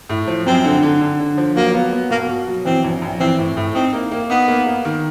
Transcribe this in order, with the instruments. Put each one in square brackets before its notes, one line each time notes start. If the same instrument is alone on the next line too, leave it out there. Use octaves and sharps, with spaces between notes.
[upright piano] A2
F3
[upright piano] F#2 [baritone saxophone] C4
[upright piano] D3
D3
D3
D3
F3
[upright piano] F#3 [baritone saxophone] A#3
[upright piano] B3
B3
[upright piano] B2 [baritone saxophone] A#3
[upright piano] B2
F#3
[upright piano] E3 [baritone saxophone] C4
[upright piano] A#1
A#1
[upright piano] E3 [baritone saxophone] C4
[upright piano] A2
A2
[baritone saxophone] C4 [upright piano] D#4
[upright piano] A#3
A#3
[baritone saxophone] B3 [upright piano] D#4
[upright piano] A#3
A#3
D#3